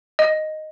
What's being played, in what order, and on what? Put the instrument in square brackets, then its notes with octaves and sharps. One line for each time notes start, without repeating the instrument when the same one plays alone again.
[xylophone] D#5